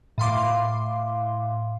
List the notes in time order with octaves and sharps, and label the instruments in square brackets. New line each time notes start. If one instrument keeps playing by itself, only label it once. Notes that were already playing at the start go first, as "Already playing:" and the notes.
[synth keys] A2 F5 C6 D6